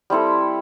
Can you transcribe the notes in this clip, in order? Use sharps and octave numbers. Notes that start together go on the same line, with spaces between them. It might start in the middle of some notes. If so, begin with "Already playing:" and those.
G3 C4 E4 A4